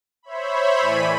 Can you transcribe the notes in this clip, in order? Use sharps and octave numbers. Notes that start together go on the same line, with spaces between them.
C5 C#5 E5 B5
A2 E3 D5 G#5 B5 D#7